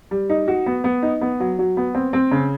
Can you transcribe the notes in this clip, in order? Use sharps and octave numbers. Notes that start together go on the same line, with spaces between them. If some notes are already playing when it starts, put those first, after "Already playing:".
G3
D#4
F#4
B3
B3
D#4
B3
F#3
F#3
B3
C4
C4
C#3